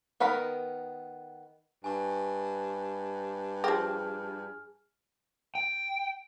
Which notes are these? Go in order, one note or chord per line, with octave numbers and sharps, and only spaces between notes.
D#3 B3 A#4 B5
G2 G#5 C#6
F3 G4 G#4 F6
G5